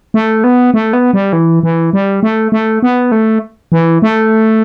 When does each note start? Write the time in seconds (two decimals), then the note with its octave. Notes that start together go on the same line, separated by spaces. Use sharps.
0.14 A3
0.44 B3
0.74 A3
0.93 B3
1.14 G3
1.33 E3
1.63 E3
1.93 G3
2.23 A3
2.52 A3
2.83 B3
3.12 A3
3.72 E3
4.02 A3